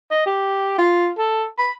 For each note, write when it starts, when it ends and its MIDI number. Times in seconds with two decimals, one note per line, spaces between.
0.11 0.24 75
0.26 0.76 67
0.78 1.09 65
1.18 1.45 69
1.58 1.72 83